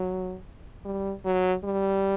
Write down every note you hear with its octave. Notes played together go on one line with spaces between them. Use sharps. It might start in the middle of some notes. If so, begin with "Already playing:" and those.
Already playing: F#3
G3
F#3
G3